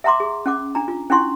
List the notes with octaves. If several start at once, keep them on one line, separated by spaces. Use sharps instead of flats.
E5 F#5 A#5 C6 D6
G#4
C#4 F#5 D6
D4 A#5
F4
C#4 D4 E4 F#5 C6 C#6